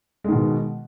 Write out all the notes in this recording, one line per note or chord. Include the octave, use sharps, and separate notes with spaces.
B2 D#3 G#3